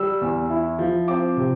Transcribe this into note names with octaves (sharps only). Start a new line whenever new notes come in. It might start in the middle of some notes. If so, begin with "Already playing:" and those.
Already playing: G3 E6
E2
E4
F3
C4 D6
C3